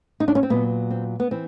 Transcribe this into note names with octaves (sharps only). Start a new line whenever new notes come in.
D#4
D4
C#4
C4
A#2 F#3 B3
C4
B3
E3 C4